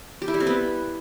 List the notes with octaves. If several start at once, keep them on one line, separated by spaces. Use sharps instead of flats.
G4
E4
G3
C4
B3